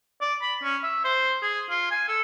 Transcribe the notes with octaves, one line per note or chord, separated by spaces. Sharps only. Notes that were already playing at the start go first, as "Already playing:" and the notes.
D5
B5
C#4
E5
C5
G#4
F4
G#5
A4